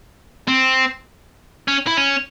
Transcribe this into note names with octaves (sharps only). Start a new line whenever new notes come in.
C4
C#4
E4
C#4